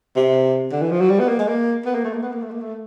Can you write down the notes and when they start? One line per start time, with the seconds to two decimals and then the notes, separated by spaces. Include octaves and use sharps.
0.16 C3
0.72 D3
0.82 E3
0.92 F3
1.01 F#3
1.10 G3
1.20 B3
1.29 A#3
1.39 G#3
1.48 A#3
1.86 B3
1.95 A#3
2.05 A3
2.14 A#3
2.23 B3
2.33 A#3
2.42 A3
2.51 A#3
2.61 A3